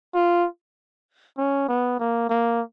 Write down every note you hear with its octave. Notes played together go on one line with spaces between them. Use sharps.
F4
C#4
B3
A#3
A#3